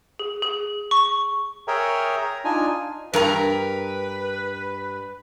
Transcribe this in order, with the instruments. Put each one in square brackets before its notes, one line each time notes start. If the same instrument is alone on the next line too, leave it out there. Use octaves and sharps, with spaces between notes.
[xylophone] G#4
G#4
C#6
[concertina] G#4 A#4 C#5 E5 G5 A#5
A#5
D4 D#4 F4 G#5
[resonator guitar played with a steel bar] G2 A#4 A#5 [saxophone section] B4